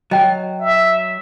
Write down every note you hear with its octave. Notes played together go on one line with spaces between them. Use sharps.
F#3 D#5 G5
E5